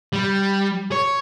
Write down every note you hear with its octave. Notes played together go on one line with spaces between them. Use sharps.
G3
C#5